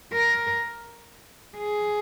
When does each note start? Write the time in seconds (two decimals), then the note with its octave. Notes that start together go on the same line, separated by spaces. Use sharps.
0.13 A#4
1.58 G#4